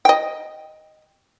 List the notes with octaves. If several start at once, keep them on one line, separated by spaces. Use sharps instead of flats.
D#5 G5